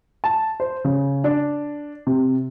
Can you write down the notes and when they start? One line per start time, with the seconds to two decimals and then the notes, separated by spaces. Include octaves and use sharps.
0.24 A5
0.60 C5
0.84 C#3
1.24 D4
2.07 C3